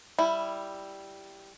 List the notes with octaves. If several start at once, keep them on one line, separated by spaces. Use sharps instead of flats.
G3 E4